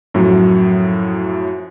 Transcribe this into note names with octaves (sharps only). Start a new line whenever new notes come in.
F#2 A2 F3 F#3